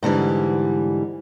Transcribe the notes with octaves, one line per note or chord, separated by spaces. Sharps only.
G#2 D3 E3 G3